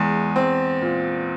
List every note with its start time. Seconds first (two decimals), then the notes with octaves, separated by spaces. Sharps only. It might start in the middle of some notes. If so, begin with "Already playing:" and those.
Already playing: E2 G#3
0.36 C4
0.81 A#2